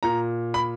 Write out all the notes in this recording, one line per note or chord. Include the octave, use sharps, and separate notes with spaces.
A#2 A#5
B5